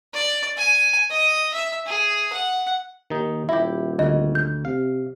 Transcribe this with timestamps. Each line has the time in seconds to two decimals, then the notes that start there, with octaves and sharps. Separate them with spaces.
0.14 D5
0.57 G#5
1.10 D#5
1.53 E5
1.86 G#4
2.33 F#5
3.10 D#2 D#3 D#4
3.49 D#1 E4 G4 E5
3.99 D2 D#5
4.35 G6
4.65 C3 F5